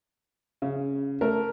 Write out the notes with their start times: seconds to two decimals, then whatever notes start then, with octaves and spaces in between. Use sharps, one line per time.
0.62 C#3
1.21 A3 A#4